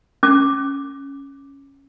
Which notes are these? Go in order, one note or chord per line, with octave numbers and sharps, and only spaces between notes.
C#4 D6